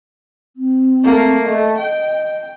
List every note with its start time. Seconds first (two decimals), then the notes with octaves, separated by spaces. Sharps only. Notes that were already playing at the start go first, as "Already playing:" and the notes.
0.56 C4
1.04 A3 A#3
1.45 A3 D#5
1.77 D#5 G5